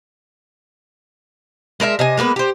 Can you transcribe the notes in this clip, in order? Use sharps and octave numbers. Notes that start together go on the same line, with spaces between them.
G#3 A#4 B4 E5
C3 D#5 G#5
G#3 A#3 B3 B4
G4 C5